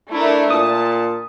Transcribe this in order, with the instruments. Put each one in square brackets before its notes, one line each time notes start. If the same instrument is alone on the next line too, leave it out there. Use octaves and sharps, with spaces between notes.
[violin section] A3 D4 A#4 [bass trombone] E4
[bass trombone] A#2 [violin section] A5 [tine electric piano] D#6